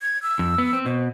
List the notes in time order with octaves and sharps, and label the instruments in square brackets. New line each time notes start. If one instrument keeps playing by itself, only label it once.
[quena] G#6
E6
[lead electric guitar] F2
B3
C4
[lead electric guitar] B2 [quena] C5